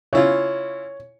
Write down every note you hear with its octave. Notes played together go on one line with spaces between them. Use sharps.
C#3 E4 F4 C#5